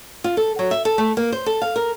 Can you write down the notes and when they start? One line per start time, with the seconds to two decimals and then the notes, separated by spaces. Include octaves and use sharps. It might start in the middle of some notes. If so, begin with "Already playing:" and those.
0.24 F4
0.37 A4
0.59 F#3
0.71 E5
0.85 A4
0.98 A3
1.17 A#3
1.32 C5
1.46 A4
1.62 F5
1.76 A#4